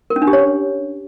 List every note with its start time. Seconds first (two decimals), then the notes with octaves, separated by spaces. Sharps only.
0.10 A#4
0.16 C#4
0.22 D4
0.27 G4
0.33 C#5